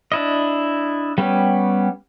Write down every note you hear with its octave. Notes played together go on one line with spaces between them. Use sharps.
D4 E4 D#5
G3 B3 C#4 G4